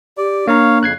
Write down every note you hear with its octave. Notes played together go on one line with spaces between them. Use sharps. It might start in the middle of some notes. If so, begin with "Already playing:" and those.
G4 D5
A#3 D4 C#5 F5 A#5
F2 C#3 F#6 G#6 C7